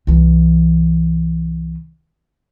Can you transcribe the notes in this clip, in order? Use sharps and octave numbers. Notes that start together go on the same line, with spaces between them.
C2 E3